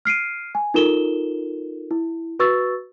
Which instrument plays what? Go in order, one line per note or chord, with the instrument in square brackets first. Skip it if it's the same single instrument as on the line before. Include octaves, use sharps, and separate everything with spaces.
[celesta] F6 C7 D7 D#7
G#5
D#4 F4 A4 A#4 E7 G7
E4
F#4 B4 C#6 E6 A6